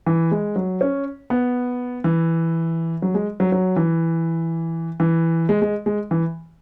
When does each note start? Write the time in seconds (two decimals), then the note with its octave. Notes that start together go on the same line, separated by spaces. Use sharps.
0.06 E3
0.31 G#3
0.56 F#3
0.81 C#4
1.30 B3
2.04 E3
3.02 F#3
3.14 G#3
3.40 F#3
3.52 F#3
3.76 E3
5.00 E3
5.49 G#3
5.62 G#3
5.86 G#3
6.11 E3